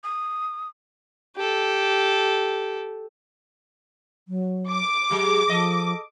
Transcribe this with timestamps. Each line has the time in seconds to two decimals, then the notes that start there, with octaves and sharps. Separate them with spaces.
0.04 D#6
1.36 G4 A4
4.28 F#3
4.71 D6
5.11 F#3 G#3 G4
5.49 F3 A4 D#5